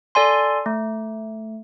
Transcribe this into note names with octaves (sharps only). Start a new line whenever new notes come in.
A4 D5 G#5 C6
A3